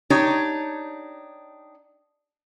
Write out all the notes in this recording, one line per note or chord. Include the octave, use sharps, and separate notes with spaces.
D4 D#4 G4 C#5